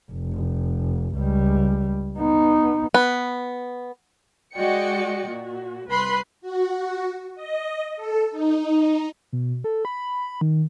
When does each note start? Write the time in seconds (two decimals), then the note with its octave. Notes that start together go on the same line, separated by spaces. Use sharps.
0.12 F1
1.15 C#2 G3
2.19 B3 D#4
2.94 B3
4.54 G#3 F#4 D5 D#5 G5 C#7
5.27 A#2 F#4
5.89 C2 B4 B5 C6 F#6 C7
6.41 F#4
7.35 D#5
7.96 A4
8.31 D#4
9.33 B2
9.64 A4
9.85 B5
10.41 D#3